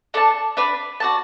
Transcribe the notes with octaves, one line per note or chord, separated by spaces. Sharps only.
D4 A4 D5 A5
D4 B4 D5
F#4 D5 A5